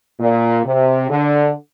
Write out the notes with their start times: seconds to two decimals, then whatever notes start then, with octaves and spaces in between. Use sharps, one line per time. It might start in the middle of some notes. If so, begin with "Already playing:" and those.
0.20 A#2
0.65 C3
1.10 D3